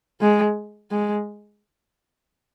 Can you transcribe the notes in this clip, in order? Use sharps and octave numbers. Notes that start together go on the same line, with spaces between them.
G#3
G#3